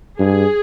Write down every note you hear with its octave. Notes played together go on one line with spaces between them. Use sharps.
G2 G#4